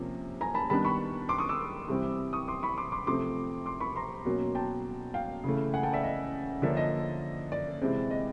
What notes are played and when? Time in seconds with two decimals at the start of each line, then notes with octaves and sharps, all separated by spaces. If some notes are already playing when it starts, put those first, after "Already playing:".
Already playing: C3 F3 A#3 C#4
0.41 G#5 A#5
0.55 A5 B5
0.70 D#3 G3 B3 D4 A5 B5
0.85 B5 C#6
1.29 C6 D6
1.38 C#6 D#6
1.49 D6 E6
1.88 C3 E3 G3 C4
2.33 C#6 D#6
2.48 C6 D6
2.63 B5 C#6
2.78 C6 D6
2.92 C6 D6
3.07 C3 F3 A3 C4 C6 D6
3.66 C6 D6
3.80 B5 C#6
3.96 A#5 C6
4.25 B2 F#3 A#3 C#4
4.55 G5 A5
5.14 F5 G5
5.44 C#3 E3 A3
5.74 F#5 G#5
5.83 G5 A5
5.93 D5 E5
6.03 D#5
6.62 D3 F3 A#3 C#4 D5 E5
6.77 D#5
7.52 D5
7.81 C3 E3 G#3 C4
8.11 D#5